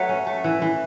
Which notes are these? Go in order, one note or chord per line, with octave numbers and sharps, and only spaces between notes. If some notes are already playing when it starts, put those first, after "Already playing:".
Already playing: F#3 A3 B4 C#5
C#4
A3
E3
E3